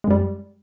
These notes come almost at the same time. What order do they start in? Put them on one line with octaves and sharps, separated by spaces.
G#3 F#2 G3